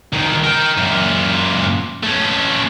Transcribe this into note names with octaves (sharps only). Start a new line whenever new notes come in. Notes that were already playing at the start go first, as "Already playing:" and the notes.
C2 D#3
A#4 G5
F#2 A#2
A3 C#4